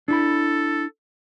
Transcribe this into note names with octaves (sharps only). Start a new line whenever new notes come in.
D4 E4 A4 B5